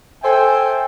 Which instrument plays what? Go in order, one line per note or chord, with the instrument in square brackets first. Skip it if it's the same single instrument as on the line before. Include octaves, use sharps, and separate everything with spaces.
[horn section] A4 C5 E5 G5 G#5